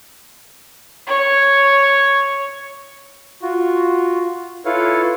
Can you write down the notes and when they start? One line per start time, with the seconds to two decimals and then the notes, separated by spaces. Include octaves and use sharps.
1.07 C#5
3.42 F4 F#4
4.65 E4 F4 A4 B4 C#5 F5